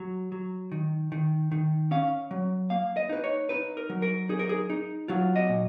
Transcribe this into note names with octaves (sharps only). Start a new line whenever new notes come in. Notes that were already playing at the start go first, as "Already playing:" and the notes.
Already playing: F#3
F#3
D#3
D#3
D#3
C#4 F5
F#3
A#3 F5
D#5
D#4 B4
C#5
D#4 B4
A#4
F#3
A#4
D#4 G#4
A#4
G#4
D#4
F#3 F4
D#5
A#2